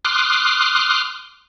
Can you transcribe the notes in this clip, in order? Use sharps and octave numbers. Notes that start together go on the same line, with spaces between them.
C6 D6 D#6 F6 F#6